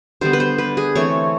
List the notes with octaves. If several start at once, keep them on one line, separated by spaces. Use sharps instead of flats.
D3 G3 B3 C5
B4
C5
B4
G#4
E3 A3 C4 C#5